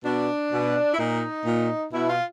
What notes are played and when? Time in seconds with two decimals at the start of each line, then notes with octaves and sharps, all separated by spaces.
0.05 B2 D4
0.52 B2
0.94 E4
0.98 A#2 D#4
1.46 A#2
1.93 B2 E4
2.09 F4